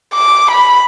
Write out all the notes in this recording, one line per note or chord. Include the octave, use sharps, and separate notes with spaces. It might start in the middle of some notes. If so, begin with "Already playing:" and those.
D6
B5